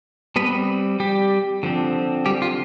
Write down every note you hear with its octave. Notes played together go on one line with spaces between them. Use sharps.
G3 B3 C4 B4
G3 G4
D3 F3 C4
G3 G4
F4